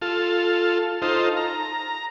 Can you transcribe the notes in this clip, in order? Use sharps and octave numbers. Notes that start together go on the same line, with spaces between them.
F4 A4
D#4 F4 A4 C5
A#5